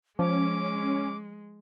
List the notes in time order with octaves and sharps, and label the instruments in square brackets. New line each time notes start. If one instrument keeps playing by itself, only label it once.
[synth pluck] F3 [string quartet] G#3 [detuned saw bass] C#4 [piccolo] D6